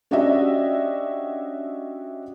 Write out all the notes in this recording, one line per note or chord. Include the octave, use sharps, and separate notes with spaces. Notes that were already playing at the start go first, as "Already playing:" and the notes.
C#4 D4 F#4 G4 D#5 E5